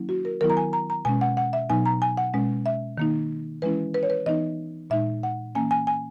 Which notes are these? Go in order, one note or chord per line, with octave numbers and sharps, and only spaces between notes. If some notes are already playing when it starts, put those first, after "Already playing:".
Already playing: D#3 F#3 A#3 C#4 E4
F#4
A#4
D#3 F#3 B3 E4 A#4
A#5
G#5
A#5
A#5
B2 G#3 C#4 G#5
F#5
F#5
E5
B2 F#3 B3 D#4 G#5
A#5
G#5
F#5
B2 G#3 C#4
E5
D#3 A#3 D#4
E3 G#3 C#4 E4 B4
B4
C#5
B4
E3 B3 D#4 D#5
A#2 G#3 D#4 E5
F#5
E3 A#3 C#4 G#5
G#5
G#5